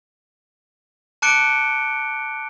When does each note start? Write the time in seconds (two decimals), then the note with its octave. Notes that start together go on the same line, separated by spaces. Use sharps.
1.22 A5 D6 F#6 C#7 D7 G7